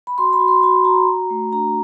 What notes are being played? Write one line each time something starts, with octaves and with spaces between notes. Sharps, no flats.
B5
F#4 C6
B5
F#4
C6
F#4 B5
F#4 A#5
F#4
A3
D4 A#5